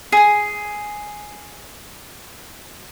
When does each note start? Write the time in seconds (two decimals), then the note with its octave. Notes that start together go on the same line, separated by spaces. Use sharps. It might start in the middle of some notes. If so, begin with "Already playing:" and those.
0.12 G#4 G#5